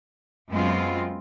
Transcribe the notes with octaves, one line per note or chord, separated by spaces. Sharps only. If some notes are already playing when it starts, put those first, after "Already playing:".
F#2 G#3 B3 C4 F4